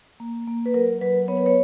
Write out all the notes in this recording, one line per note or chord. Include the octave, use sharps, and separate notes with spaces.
A#3
A#3
B4
F#3 A#4
F#3 B4
B3 C#5
B4
C#5